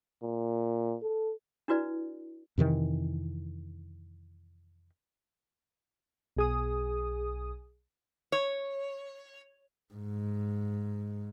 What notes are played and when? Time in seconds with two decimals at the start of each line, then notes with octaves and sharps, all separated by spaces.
0.22 A#2
1.02 A4
1.68 D4 E4 F#4 B4 D5
2.58 F2 C3 D#3 E3
6.36 B1 G#4 D#6
8.32 C#5
9.94 G#2